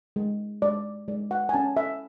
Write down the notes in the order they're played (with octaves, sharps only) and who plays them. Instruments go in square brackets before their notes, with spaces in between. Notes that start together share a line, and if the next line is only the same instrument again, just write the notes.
[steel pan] G#3
G#3 D5
G#3 D5
F#5
G#5
C#4 A5
E5